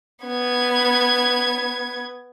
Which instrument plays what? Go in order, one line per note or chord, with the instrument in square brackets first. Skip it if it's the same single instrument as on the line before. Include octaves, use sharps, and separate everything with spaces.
[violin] B3 G#6